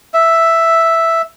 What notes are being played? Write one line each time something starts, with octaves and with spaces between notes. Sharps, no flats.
E5